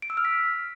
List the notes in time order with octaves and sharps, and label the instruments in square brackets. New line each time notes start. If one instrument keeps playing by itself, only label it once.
[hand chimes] D7
E6
F6
B6